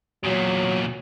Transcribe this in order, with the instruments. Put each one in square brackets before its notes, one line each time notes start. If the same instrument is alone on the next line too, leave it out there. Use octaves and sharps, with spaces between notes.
[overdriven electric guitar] E2 A#2 [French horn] F#3